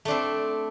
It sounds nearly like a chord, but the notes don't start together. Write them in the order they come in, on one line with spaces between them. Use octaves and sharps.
A3 D4 C4